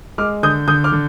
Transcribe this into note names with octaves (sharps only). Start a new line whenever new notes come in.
G#3 D6 F6
D3 D#6 G6
D3 D#6 G6
D6 F6
D3